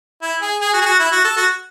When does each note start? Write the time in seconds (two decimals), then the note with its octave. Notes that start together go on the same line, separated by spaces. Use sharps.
0.22 E4
0.42 G#4
0.61 G#4
0.73 F#4
0.81 G#4
0.86 F#4
0.99 E4
1.12 F#4
1.24 A4
1.37 F#4